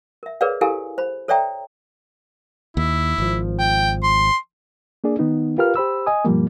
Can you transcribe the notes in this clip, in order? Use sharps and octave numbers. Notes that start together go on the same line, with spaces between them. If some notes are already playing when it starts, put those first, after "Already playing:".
A#4 E5
G#4 A#4 B4 C#5 D5 F5
E4 G4 A4 A#4 F5 G#5
C5 B5
A4 C#5 D5 E5 G5 A#5
D#2 E4
G#1 F3
G5
C6
A#3 D4 G#4 D5
D#3 B3 D#4
F4 G4 A#4 B4 F5 F6
G4 C5 B5 E6
D#5 G#5 D#6
G2 B2 F3 G3 A#3